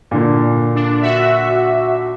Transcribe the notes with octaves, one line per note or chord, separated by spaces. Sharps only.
A#2 D3
D4
F#4 E5